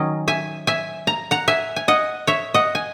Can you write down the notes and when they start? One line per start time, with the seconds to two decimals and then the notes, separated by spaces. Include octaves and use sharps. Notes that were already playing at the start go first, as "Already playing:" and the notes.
Already playing: D#3 F#3 C#4 D#5
0.28 E5 G#5
0.67 E5 G#5
1.07 A#5
1.31 F#5 A#5
1.48 E5 G#5
1.76 G#5
1.88 D#5 F#5
2.27 C#5 E5
2.54 D#5 F#5
2.75 G#5